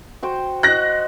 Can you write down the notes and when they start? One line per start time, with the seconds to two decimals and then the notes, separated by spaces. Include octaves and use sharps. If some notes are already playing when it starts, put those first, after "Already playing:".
0.23 F#4 C5 G5
0.63 F#4 D#5 F#6 A#6